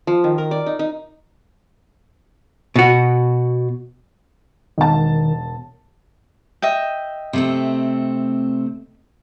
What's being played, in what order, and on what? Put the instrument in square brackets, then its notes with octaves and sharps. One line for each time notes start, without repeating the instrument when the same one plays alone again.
[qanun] F3
D#3
A#4
D5
D#4
D#4
[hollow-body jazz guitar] B2 F#4
[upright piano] E1 A5 [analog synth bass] D#3
[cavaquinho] D#5 E5 G5
[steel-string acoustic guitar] C3 A3 C4